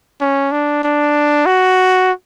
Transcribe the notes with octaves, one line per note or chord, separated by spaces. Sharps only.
C#4
D4
D4
F#4